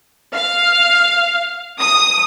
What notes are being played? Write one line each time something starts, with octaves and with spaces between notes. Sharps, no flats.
F5
D#6